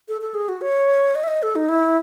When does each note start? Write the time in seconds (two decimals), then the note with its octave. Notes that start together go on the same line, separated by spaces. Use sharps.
0.08 A4
0.21 A4
0.34 G#4
0.49 F#4
0.61 C#5
1.15 D#5
1.24 E5
1.28 D#5
1.43 A4
1.56 D#4
1.69 E4